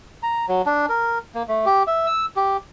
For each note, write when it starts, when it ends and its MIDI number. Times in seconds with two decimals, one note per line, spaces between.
0.23 0.46 82
0.48 0.62 54
0.66 0.86 62
0.89 1.18 70
1.35 1.43 58
1.48 1.65 57
1.66 1.83 67
1.87 2.06 76
2.06 2.26 88
2.36 2.57 67